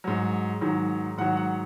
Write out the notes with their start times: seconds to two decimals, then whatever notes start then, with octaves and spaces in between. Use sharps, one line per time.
0.04 G#2 F#3
0.61 G#2 D#3 F#3
1.17 G#2 D#3 F#3 F#5
1.37 F#5